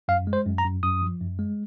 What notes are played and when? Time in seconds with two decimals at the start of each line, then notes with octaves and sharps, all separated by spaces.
0.08 F#2 F5
0.27 G#3
0.33 C5
0.46 F#2
0.58 A#5
0.65 F#2
0.83 F#2 D#6
1.02 F3
1.20 F#2
1.39 G#3